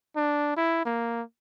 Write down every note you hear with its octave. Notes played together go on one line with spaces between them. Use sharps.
D4
E4
A#3